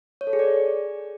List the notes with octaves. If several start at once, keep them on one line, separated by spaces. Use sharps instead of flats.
C#5
A4
G#4
D5